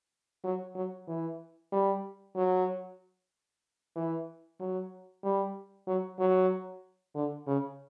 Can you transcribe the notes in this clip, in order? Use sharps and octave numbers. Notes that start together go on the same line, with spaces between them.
F#3
F#3
E3
G3
F#3
E3
F#3
G3
F#3
F#3
D3
C#3